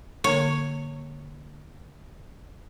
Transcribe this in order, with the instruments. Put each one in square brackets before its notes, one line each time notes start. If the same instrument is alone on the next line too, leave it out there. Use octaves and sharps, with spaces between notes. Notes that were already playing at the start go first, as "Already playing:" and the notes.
[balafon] D3 A#3 C#6 [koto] C#5